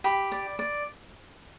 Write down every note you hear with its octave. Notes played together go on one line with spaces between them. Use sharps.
G4 B5
D5
D5